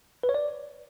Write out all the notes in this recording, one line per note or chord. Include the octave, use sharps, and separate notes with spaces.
B4
C#5
D5